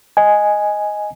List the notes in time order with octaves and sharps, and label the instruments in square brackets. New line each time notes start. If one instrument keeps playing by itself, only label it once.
[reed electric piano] D#5 G#5